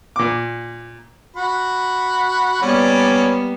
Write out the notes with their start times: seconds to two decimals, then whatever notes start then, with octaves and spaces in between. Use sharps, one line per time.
0.16 A#2 D6
1.36 F#4 B5
2.62 G3 A#3 B3 C#4 D5